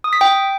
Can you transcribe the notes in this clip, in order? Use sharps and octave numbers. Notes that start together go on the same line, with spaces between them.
D#6
B6
G5